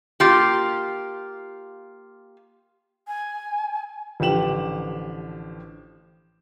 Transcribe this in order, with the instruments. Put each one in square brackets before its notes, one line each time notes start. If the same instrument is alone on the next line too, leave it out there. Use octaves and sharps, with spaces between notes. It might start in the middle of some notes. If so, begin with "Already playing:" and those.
[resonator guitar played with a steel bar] A#3 F4 G4
[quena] G#5
[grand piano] A1 D3 F3 G4 E7 F#7